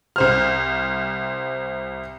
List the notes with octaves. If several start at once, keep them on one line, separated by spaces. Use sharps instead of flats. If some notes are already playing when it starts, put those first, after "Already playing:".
C2 C5 F6